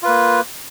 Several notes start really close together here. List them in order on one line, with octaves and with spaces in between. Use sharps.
F4 B4 A#3